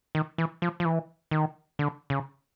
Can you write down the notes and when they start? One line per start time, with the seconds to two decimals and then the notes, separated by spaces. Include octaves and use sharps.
0.15 D#3
0.38 E3
0.62 F3
0.80 F3
0.85 E3
1.31 D#3
1.79 D3
2.10 C#3